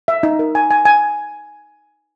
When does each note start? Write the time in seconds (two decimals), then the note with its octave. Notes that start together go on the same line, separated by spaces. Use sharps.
0.08 E5
0.23 D#4
0.39 A#4
0.55 G#5
0.71 G#5
0.85 G#5